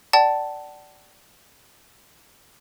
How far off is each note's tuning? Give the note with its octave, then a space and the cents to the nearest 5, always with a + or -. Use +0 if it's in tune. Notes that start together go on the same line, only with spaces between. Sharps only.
D5 +0 F#5 +45 A5 +0